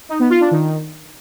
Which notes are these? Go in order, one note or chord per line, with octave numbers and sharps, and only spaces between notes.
D#4
B3
F4
D4
D#3